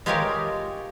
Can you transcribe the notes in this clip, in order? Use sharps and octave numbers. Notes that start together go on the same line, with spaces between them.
G#3 F4 G4 A#4 C#5 F5